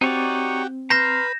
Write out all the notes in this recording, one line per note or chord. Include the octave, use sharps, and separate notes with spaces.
C4 D#4 F#4 G4 C#5 D5
B4 A#5 C6 F6 G6 A#6 E7